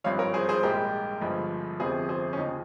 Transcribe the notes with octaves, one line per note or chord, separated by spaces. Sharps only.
G#1 G2 F3 C#5 F5
A#4 C#5
G#4 C5
G#4 C5
A#1 G#2 G3 G4 A#4
G1 G2 F3 G#3
G1 F2 C3 F3 G#4 C5
G#4 C5
C#4
D#2 C#3 F3 D#4